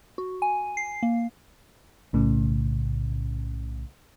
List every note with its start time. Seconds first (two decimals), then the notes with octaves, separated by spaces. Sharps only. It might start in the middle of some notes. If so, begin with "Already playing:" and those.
0.18 F#4
0.42 G#5
0.77 C7
1.03 A#3
2.13 B1 A2 C#3